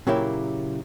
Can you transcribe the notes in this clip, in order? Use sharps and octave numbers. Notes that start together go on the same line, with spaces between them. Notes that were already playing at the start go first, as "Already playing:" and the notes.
A#2 C#3 F#3 A#3 E4 G4